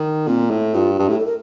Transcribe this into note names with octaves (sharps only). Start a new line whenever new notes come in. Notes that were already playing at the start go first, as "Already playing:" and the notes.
Already playing: D#3
A#2 C4
A2
G2 F4
G2 G4
A2 G4
A4
A#4